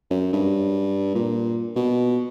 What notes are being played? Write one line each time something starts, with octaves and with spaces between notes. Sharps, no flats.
F#2
G2
A#2
B2